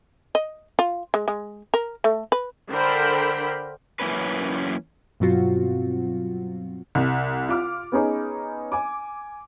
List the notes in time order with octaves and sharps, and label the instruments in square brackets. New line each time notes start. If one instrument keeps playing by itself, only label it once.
[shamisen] D#5
F4
G#3
G#3
A#4
A3
B4
[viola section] D3 A#4 C5 G5 B5
[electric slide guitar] F#2 E3 A#3 C#4 B4
[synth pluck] G2 B2 F#3 C4 F4 F#4
[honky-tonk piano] C2
F4 D6 F6
B3 C#4 D#4 G#4
G#5 D6